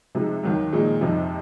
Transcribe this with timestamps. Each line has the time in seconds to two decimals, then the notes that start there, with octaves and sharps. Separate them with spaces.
0.15 C3 F3 G#3 D#4
0.43 D#2 D#3 F#3
0.72 A#2 F3 G#3 D#4
1.01 F2 C3 F3 C4 D#4